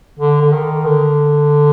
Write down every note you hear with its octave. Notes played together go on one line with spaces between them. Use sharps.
D3
D3
D#3
D3